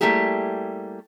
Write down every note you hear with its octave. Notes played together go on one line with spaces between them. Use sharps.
G3 A3 A#3 E4 G4 G#4